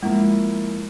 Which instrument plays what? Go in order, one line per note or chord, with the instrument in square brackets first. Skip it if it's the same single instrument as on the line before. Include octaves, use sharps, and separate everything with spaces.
[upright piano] F3 A#3 E4 [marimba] G#3